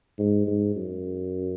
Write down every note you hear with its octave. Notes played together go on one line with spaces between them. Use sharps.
G#2
G#2
F#2